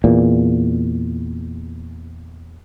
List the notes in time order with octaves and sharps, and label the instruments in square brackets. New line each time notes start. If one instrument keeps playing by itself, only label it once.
[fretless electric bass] E2 A#2